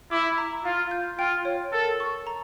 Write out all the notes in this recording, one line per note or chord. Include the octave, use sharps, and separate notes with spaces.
E4 D6
A#5
F4 F5
G6
F4 G5
C#5
A4 A#4
C#6
A#5